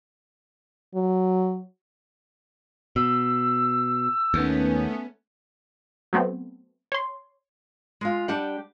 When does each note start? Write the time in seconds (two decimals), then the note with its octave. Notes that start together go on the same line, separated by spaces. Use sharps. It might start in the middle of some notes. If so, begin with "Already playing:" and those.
0.95 F#3
2.96 B2 E6
4.34 D#2 A3 B3 C#4
6.13 F#3 A3 B3 C4
6.92 C#5 C6
8.01 G#3 F4
8.28 G3 D4 G4 D5 F#5